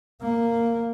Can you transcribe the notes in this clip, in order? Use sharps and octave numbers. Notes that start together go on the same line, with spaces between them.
A#3